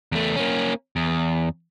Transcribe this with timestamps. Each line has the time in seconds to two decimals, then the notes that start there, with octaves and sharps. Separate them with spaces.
0.12 E2 A3
0.36 A#3 C#4
0.96 E2